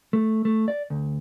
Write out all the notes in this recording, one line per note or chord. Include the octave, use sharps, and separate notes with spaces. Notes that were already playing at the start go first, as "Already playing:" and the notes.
A3
A3
D5
D2